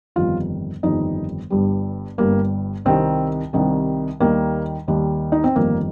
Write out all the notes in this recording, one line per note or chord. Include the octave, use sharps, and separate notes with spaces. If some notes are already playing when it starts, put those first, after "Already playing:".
G1 F2 D#3 G3 F4
G1 F2 D#3 G3 D#4
G1 G2 G3
G1 G2 G3 A#3
C2 C3 D#3 G3 C4
C2 C3 D#3 G3
D#2 D#3 G3 A#3
D#2 D#3 G3
D#4
C4
G1 F2 D#3 G3 A#3